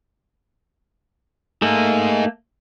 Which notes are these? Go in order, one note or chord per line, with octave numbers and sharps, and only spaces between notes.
A3 A#3 D#4 G#4